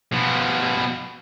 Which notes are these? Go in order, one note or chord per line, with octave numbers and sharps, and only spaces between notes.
B2 F3